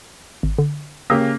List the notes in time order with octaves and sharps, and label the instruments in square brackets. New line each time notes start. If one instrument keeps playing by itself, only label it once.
[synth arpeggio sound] G#1
D3
[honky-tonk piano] C#3 C#4 G4 [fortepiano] A#3 [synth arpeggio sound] D#6 E6 A#6